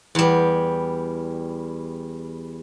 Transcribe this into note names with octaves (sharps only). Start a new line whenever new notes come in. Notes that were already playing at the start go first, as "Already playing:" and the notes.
E2 G3